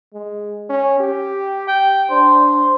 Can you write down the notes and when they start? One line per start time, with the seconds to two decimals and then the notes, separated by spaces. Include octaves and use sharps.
0.14 G#3
0.69 C#4
1.00 G4
1.68 G5
2.10 D4 C5